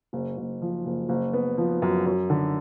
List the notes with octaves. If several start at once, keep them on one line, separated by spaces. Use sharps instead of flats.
F#1
F#1
F3
F#1
F#1
B3
F3
F#2
F#2
D3